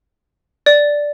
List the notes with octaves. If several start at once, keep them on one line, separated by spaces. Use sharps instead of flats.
D5